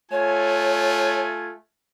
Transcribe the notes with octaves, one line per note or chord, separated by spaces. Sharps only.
A3 F4 C#5 G#5